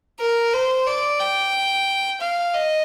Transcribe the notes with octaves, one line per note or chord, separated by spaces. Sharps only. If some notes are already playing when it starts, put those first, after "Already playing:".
A#4
C5
D5
G5
F5
D#5